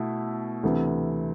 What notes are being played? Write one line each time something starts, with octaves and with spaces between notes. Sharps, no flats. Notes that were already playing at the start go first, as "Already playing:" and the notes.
Already playing: B2 A3 E4
D2 C3 E3